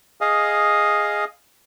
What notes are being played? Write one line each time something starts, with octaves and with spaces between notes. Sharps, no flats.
G#4 D#5 F5